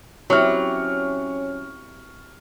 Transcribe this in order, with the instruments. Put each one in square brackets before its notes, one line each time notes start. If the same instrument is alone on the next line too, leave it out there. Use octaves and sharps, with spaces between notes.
[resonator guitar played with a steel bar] F#3 [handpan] C4 E4 G4 [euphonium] C#4 [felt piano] C#6 F6